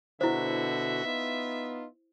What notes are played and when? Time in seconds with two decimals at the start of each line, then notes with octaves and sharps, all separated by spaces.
0.21 B2 D3 E4 F#4 C5 E5
1.04 B3 D#4 F4